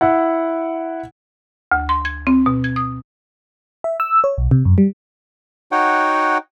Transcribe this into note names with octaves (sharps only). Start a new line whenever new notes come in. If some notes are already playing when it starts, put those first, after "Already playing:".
E4 F#5
D2
C6
G#6
C4
B2
G#6
D#6
E5
E6
C#5
B1
C3
F#2
G3
D#4 F#4 C#5 F#5 G5